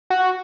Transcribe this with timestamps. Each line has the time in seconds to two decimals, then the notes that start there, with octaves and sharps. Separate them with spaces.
0.10 F#4